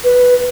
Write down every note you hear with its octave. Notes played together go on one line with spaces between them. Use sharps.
B4